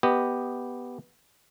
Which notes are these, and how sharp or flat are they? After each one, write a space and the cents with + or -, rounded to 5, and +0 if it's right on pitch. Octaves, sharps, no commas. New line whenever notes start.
B3 +0 G4 +0 D#5 -10